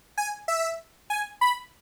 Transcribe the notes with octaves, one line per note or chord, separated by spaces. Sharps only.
G#5
E5
G#5
B5